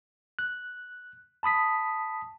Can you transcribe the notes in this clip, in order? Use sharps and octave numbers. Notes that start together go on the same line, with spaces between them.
F#6
A5 B5 D#6 B6